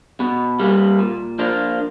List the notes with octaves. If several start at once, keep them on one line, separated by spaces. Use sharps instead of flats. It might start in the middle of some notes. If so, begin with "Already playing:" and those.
B2
G3 A#3
A#2
F3 A#3 D4 F4